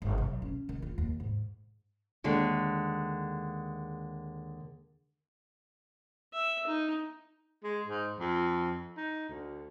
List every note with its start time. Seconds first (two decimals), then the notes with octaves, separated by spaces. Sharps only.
0.02 G1
0.18 B1
0.42 C#4
0.69 D#3
0.82 F4
0.98 D#2
1.20 G#2
2.24 D#2 D3 G#3
6.33 E5
6.67 D#4
7.64 G#3
7.87 G#2
8.19 F2
8.97 D#4
9.29 D2